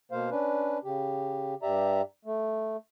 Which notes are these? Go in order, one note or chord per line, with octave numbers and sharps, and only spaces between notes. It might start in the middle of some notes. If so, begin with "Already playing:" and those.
B2 A#3 C5 F5
C#4 D4 B4
C#3 G4
G2 G4 D5 E5 A#5
A3